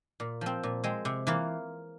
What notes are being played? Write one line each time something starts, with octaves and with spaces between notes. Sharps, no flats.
A#2
F3 C4
A#2
G#3 C4
C3
E3 A#3 F4